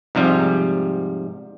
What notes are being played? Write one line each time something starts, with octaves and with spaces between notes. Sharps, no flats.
G#2 C3 F3 G3